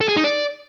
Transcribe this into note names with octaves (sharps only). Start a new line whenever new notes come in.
A4
G#4
D#4
D5